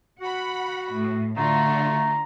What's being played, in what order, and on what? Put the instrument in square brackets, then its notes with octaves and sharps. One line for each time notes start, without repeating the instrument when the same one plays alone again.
[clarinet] F#4 [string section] F#5 B5
[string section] A2
[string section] D3 F4 F#4 [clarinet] A3 [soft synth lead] A#5